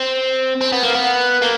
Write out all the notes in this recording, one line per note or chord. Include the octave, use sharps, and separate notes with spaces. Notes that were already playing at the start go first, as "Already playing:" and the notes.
Already playing: C4
C4
B3
A#3
B3
A#3